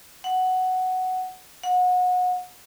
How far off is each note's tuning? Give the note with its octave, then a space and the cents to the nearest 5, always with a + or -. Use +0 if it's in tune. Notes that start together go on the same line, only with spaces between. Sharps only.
F#5 +5
F#5 -30